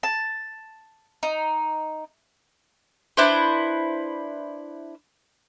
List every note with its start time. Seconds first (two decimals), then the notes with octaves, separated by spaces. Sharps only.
0.03 A5
1.23 D#4
3.17 D4 E4 B4 C5